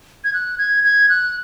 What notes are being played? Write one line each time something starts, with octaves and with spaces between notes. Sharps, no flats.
G#6
F#6
G#6
G#6
F#6